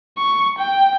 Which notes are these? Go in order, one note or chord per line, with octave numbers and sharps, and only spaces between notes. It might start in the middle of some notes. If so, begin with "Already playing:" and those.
C#6
G5